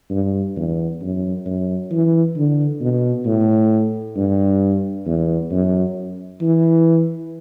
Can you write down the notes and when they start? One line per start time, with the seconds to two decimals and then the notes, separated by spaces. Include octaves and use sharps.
0.10 G2
0.57 E2
1.02 F#2
1.46 F#2
1.92 E3
2.37 D3
2.81 B2
3.26 A2
4.17 G2
5.06 E2
5.51 F#2
6.42 E3